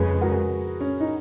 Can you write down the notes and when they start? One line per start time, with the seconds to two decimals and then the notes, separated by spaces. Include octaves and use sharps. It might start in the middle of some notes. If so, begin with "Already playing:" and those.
Already playing: F2 C#3 G#3 G#4 B4
0.21 F#4 A#4
0.81 C#4
1.00 D#4